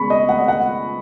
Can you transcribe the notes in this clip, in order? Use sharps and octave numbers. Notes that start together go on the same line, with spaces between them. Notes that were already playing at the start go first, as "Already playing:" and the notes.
Already playing: C#3 G#3 B3 B5 C#6
D#5
F#5
D#5
F#5